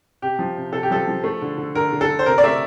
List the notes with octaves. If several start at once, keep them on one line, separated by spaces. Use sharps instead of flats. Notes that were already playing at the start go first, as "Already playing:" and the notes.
C3 G4
F3
C3
C3 A4
G4
F3 A4
F3
A3
D3
D3
D3 A#4
D3
A4
D3
C5
C3 A#4
D5
A3 E5